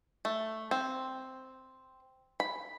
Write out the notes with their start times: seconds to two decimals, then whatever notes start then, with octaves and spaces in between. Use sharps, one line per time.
0.25 A3
0.71 C4
2.40 B5